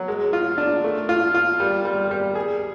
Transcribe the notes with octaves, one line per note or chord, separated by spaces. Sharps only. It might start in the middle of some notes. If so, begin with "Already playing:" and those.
Already playing: F#3
G#3
F4
D4
A3
F4
F4
G3
G3
G3
G#4